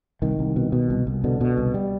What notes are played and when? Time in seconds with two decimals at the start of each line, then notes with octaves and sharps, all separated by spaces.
0.22 C2 D#3
0.39 C2
0.56 B2
0.72 B2
0.90 C2
1.07 C2
1.24 B2 D3
1.41 B2
1.57 C2
1.74 G3